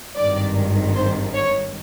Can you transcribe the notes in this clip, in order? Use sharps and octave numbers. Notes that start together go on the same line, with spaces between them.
G#1 G2 D#3 D5
C5
C#5